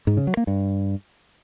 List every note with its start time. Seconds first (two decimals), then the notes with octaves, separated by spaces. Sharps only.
0.07 G#2
0.17 C#3
0.27 F#3
0.37 A#3
0.47 G2